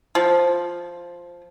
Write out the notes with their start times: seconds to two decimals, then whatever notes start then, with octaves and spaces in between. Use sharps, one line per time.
0.15 F3